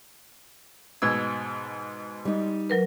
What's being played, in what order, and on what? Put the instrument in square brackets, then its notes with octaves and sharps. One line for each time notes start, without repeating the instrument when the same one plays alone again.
[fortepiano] G#2 B2 E6 [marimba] G#6
[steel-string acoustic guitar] G3 D#4
[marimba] F#3 A#4 B4